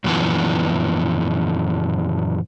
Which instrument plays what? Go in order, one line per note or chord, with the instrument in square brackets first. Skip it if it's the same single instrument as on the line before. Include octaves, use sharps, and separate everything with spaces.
[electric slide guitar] F#2 A#2 D3 E3 F3 B3